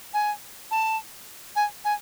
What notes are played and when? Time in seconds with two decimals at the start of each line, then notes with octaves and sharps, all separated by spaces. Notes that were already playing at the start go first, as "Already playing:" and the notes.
0.14 G#5
0.71 A5
1.56 G#5
1.84 G#5